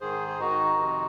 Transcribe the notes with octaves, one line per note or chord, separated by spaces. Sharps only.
G#2 D#3 G#4 C5
G#4
G#2 D#3 D#4 F#4
F2 C3 D#3